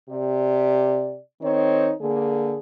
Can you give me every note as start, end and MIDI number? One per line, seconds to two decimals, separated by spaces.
0.10 1.18 48
0.10 1.18 67
0.10 1.18 74
1.41 1.91 51
1.41 1.91 60
1.41 1.91 63
1.41 1.91 73
2.01 2.57 50
2.01 2.57 58
2.01 2.57 68